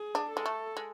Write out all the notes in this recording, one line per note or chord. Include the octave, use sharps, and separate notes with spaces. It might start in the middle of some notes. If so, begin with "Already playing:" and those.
Already playing: G#4
D4
A4
G#3
A3
G#3